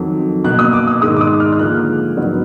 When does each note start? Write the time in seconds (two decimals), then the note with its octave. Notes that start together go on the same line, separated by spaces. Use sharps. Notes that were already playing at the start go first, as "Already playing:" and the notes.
Already playing: F2 D#3 F#3
0.44 B2 A#3 F#6
0.59 D#6
0.73 D6
0.87 D#6
1.02 G#2 D#3 G#3 D#6
1.17 D6
1.21 D#6
1.40 F6
1.52 F6
1.59 D2 D3 F3 A#3 F#6
2.17 G#2 F#3 B3